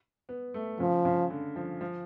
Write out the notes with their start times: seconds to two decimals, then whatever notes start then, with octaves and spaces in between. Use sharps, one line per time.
0.29 B3
0.54 A3
0.80 C#3 F3
1.05 C#3
1.30 D3
1.56 F3
1.81 F3